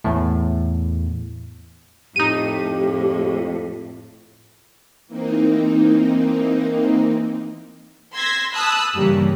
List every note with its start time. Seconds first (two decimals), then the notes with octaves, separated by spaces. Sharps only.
0.04 E2 A2
2.16 F2 A2 D#4 G4 D#7
5.07 E3 A#3 C4 D#4
8.14 C6 E6 G#6 A#6 B6
8.53 A5 B5 D#6 E6 F#6
8.96 G2 C#3 E3 G3 A#3